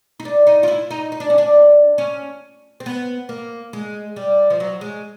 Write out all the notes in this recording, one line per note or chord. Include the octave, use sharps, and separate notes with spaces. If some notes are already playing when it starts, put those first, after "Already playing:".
D#4
D4
D#4
F4
E4
D#4
D#4
D4
C#4
D4
C#4
C4
B3
A#3
G#3
G3
F3
F#3
G#3